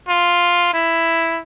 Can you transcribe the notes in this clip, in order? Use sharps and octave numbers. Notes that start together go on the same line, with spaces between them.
F4
E4